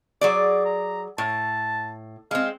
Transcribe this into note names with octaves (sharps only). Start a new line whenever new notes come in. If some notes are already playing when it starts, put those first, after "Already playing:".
F#3 G#4 D5 D6
A#5
A2 A5
G#3 C4 F5